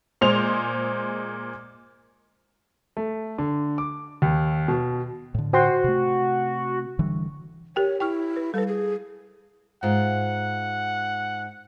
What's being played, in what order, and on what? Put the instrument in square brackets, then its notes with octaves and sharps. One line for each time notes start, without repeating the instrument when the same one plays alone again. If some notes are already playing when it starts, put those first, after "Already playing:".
[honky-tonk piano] A#2 G#3 C5 F7
[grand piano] A3
D3
D6
D#2
B2
[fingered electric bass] A2 D3
[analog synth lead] F#4 [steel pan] C5 G5 C6
[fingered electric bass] C3 A3
D3 E3 G3
[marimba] G4 A#4 G5 [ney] C#5
[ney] E4 [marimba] G5 C#6 F6
[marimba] B4
[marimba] G3 B4 [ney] A4
[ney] G#4
[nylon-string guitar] G#2 F4 [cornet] F#5